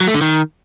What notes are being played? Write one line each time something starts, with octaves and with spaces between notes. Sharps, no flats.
F#3
A3
D3
D#3